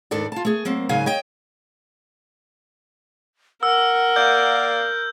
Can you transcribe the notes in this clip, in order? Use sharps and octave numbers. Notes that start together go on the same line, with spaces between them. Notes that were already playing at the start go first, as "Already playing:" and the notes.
D#2 G#2 D4 A4 D5
F4 A5
A3 G#4
F#3 A#3 C4
G#2 C#3 F#3 F5 G#5
C#5 D#5 G5
A#4 F#5 E6
A#3 D5 F5 G6